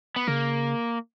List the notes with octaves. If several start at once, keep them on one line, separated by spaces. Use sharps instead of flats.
B3
C#3 A#3